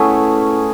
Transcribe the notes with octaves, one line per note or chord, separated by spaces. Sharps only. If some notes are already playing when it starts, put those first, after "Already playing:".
Already playing: A3 B3 C#4 E4 G#4